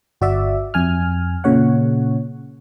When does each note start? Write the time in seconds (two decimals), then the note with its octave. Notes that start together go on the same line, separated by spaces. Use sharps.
0.21 G1 F#4 D5 E5
0.74 F2 G#5 F6
1.44 A#2 C#3 C#5 F#5